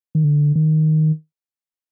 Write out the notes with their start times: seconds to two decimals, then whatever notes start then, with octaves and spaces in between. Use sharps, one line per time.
0.15 D#3
0.24 D3
0.56 D#3